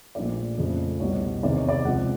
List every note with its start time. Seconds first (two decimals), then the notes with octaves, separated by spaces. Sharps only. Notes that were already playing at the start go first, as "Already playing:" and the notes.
0.15 A#1 A#2 F3 A3 D5
0.57 F2 C#3 F3 A3
1.00 C2 B2 G3 C#5
1.43 E2 C3 D#3 D5
1.56 C#5
1.69 D5
1.85 C#2 C3 F3 F#5